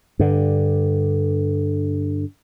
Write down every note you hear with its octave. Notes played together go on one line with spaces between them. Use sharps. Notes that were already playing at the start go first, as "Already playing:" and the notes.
G2 D3